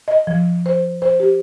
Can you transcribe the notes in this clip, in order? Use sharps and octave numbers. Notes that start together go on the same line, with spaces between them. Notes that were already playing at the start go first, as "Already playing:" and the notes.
D#5
F3
C5
C5
G4